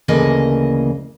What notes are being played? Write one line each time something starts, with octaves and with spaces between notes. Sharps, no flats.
D2 C#3 E3 A#3 D#5